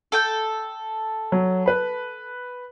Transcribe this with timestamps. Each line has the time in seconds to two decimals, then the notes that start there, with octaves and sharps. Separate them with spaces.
0.12 A4 G5 G6
1.32 F#3
1.66 B4 B5